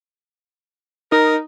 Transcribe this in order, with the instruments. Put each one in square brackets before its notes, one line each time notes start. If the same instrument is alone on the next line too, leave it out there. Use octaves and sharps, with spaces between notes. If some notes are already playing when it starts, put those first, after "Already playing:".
[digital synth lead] D#4 [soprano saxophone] A#4